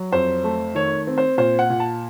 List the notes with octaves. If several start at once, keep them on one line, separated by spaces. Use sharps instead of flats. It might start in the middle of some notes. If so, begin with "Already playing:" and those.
Already playing: F#3
F2 C5
A3
D#3 C#5
C4
C5
A#2 C5
F#5
A#2
A5